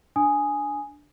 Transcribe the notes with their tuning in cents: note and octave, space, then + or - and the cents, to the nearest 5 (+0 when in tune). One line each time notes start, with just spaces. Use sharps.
D4 +0 G#5 +0 D#6 +0